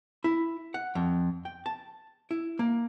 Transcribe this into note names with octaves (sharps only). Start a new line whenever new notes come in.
E4
F#5
F2
G5
A5
E4
A#3